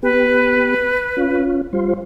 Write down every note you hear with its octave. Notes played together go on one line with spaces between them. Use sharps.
B3 G4 B4
C#4 F4
G3 F4 C5